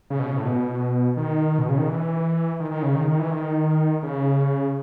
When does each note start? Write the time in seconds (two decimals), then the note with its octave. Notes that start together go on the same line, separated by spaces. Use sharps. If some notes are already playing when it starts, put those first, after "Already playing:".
0.10 C#3
0.19 B2
0.27 C#3
0.37 A2
0.45 B2
1.17 D#3
1.59 B2
1.69 C#3
1.78 D#3
1.88 E3
2.60 D#3
2.71 D#3
2.83 C#3
2.95 D#3
3.08 D#3
3.19 E3
3.31 D#3
4.03 C#3